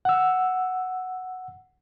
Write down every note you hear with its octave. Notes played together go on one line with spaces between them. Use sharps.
F#5 E6